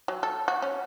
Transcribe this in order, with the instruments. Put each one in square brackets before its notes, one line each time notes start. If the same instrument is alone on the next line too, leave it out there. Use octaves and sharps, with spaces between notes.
[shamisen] F#3
A4
F#4
C#4